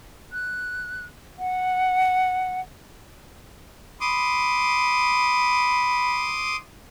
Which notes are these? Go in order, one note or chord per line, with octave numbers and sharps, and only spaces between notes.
F#6
F#5
B5 C6 D6 D#6